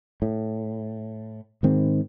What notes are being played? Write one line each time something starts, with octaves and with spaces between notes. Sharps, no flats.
A2
G#2 D#3 C4